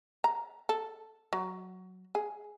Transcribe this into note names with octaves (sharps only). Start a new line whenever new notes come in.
A#5
A4
F#3
G#4